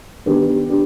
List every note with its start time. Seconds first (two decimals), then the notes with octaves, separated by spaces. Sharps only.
0.26 D#3 B3 D4 G4
0.70 D4 G4